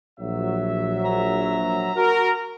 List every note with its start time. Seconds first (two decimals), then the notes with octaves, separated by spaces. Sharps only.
0.19 A#1 F#3 E5
1.05 A#5
1.96 F#4 A#4